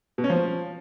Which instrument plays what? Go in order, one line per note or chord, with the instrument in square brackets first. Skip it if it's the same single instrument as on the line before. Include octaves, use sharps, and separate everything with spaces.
[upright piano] B2
C#4
F3